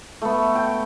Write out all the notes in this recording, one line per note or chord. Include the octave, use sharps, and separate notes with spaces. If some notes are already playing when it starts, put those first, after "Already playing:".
A3 B3
G5